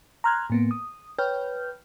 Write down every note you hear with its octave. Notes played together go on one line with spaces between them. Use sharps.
A#5 C6 F6 F#6 G#6
A2 A#3 B3
D#6
B4 C#5 G5 F6 G6